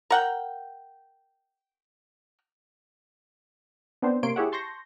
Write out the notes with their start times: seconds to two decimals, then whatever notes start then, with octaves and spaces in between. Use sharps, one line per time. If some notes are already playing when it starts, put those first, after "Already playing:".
0.10 A#4 F#5 G5
4.02 B3 C4 D4 C5
4.23 C3 A#3 C#5 C6 D7
4.36 E4 G4 G#4 C#5 E5 F#5
4.52 A5 C6 C#6 G6 A#6